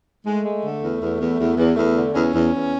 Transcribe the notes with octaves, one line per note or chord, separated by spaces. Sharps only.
G#3 A3
G#3
D3
E2
E2
E2
E2
E2
E2 A3
D3
E2 C#4
E2
E2